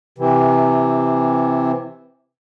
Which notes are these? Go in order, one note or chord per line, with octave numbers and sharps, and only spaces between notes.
C3 E3